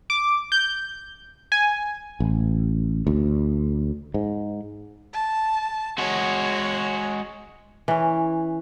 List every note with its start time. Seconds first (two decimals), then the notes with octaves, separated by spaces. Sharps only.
0.10 D6
0.52 G6
1.52 G#5
2.20 A1
3.07 D2
4.14 G#2
5.13 A5
5.98 G#3 F#4 C#5
7.88 E3 C#4